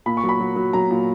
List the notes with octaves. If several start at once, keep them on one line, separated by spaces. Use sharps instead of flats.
A#2 B5
C#6
F#3
B5
F#3
F#3
F#3 A#5
A#2